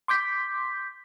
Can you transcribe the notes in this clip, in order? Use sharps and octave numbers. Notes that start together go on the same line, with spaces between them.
C6 D6 G6 B6